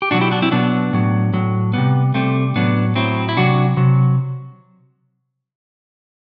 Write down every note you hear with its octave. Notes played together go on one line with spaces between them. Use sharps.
G4
B2 F#3 D4 F#4
E4 G4
D4 F#4
C4 E4
B2 F#3 B3 D4
A2 F#3
A2 F#3
C3 G3 B3
C3 G3 A3 C4
A2 F#3 B3 D4
A2 F#3 C4 E4
E4
C3 F#3 D4 F#4
C3 F#3